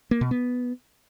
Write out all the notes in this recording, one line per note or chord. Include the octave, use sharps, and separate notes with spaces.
A#3
B2
B3